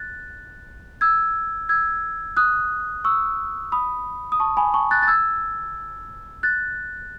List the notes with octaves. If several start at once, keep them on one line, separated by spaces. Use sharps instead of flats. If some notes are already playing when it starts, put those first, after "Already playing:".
Already playing: F#6 A6
E6 G#6
E6 G#6
D#6 F#6
C#6 E6
B5 D#6
D#6
A5 C#6
G#5 B5
A5 C#6
F#6 A6
A6
E6 G#6
F#6 A6